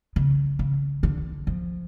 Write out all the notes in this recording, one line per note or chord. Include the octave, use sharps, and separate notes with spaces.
C#3
C#3
D3
F3